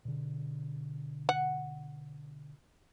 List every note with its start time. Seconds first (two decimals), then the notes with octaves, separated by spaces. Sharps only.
0.05 B2 D3
1.29 F#5